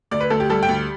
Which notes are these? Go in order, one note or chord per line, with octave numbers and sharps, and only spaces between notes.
D2 D5
B4
D2 A4
G4
G3 A4
G5
D2